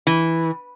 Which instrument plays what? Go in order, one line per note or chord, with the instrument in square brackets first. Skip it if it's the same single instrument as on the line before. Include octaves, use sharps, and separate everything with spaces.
[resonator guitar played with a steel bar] E3